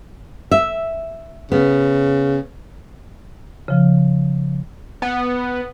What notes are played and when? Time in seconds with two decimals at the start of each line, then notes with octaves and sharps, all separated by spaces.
0.51 E5
1.52 C#3 B3
3.68 C#3 F3
5.02 B3